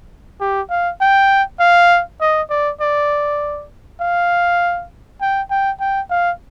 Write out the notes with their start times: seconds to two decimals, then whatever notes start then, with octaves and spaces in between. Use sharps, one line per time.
0.41 G4
0.70 F5
1.01 G5
1.60 F5
2.21 D#5
2.50 D5
2.81 D5
4.01 F5
5.21 G5
5.50 G5
5.80 G5
6.10 F5